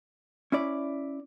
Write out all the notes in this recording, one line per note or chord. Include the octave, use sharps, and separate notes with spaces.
C#4 E4 D5